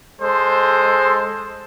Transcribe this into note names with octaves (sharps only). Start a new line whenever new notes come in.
G#3 A4 C5